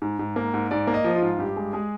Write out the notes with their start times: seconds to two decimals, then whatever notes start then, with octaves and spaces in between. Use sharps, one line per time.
0.02 G#2
0.19 G#2
0.36 A#3
0.54 G#2
0.71 G#2 D5
0.87 A#3
0.94 D#5
1.04 F3
1.16 F4
1.22 G#2
1.39 G2 G4
1.57 G#3
1.73 G#3 G#4